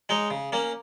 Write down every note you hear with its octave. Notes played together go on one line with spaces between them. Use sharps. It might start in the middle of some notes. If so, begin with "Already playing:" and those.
G#3 D#4 C#5
C#3
A#3 C#4